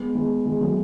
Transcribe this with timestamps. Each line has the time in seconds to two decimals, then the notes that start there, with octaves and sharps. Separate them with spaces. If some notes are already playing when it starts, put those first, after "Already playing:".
Already playing: G#3 B3
0.15 G#3 B3
0.45 G#3
0.61 F#3 A3